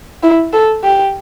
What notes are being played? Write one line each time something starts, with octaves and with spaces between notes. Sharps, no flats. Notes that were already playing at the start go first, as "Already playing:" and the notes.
E4
A4
G4